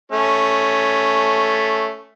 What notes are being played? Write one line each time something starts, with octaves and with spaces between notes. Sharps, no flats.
A3 C#4